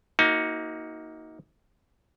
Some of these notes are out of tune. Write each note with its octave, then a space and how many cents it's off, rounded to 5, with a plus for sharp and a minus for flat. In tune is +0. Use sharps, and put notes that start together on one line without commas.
A#3 +5 D#4 +30 F#4 -5